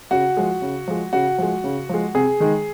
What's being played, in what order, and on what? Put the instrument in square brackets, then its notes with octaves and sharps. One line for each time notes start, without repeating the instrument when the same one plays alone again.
[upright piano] C#3 F#4
F3 G#3
C#3
F3 G#3
C#3 F#4
F3 G#3
C#3
F3 G#3
C3 G#4
D#3 G#3